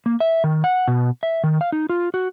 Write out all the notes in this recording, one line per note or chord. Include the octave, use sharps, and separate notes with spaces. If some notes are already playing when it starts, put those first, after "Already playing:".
A#3
E5
D#3
F#5
B2
E5
D#3
F5
D#4
F4
F#4